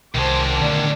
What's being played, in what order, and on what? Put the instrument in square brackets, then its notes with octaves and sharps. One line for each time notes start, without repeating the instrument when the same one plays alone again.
[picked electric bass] C2 [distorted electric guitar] F#2 G#3 [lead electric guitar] D#3 C6 [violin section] C5 A5 D6
[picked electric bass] D3 A3 B3 [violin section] D4